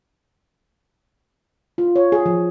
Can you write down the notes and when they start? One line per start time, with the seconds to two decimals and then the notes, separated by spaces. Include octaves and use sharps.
1.78 F4
1.96 C#5
2.12 G#4
2.26 F3